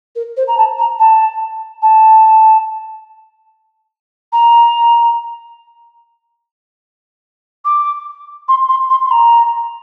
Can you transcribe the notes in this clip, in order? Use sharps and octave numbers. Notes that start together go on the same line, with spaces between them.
A#4
C5
A#5
A5
A#5
A5
A5
A#5
D6
C6
C6
C6
C6
A#5